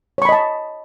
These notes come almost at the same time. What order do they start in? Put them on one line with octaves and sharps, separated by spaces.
C#5 C#6 B5 D#5 A5